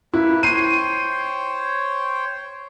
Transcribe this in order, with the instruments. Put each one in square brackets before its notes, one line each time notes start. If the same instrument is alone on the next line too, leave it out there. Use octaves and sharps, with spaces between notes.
[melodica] A#3 B4 [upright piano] E4
[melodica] C5 C#5 G5 [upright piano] C7 D#7